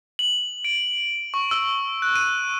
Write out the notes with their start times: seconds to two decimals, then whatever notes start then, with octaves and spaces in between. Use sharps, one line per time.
0.19 F#7
0.65 D7
1.34 C#6
1.51 E6
2.02 F#6
2.16 D#7